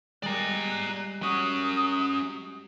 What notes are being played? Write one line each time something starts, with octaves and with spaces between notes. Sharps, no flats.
G3 G#3 D5 A#5 F#6
C#4 F#4 D#6